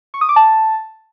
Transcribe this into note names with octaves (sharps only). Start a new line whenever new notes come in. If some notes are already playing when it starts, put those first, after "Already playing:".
C#6
D#6
D6
A5